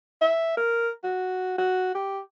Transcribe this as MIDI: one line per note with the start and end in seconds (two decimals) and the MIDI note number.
0.21 0.57 76
0.58 0.89 70
1.04 1.57 66
1.58 1.93 66
1.95 2.19 67